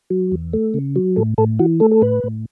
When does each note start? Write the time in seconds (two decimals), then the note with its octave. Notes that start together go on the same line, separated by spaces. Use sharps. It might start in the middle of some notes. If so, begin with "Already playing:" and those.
0.10 F#3
0.32 E2
0.53 A3
0.74 C#3
0.96 F#3
1.16 A2 A4
1.38 A2 A4
1.59 E3 F#4
1.80 A3 A4
1.91 A4
2.02 A2 B4
2.24 A2